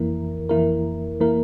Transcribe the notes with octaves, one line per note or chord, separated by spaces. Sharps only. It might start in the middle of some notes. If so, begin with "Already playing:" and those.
Already playing: F2 E3 A#3 E4 A#4
F2 E3 A#3 E4 A#4
E3 A#3 E4 A#4